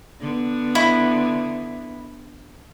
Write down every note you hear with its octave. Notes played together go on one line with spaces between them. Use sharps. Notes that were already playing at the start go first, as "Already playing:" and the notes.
D3 B3
E4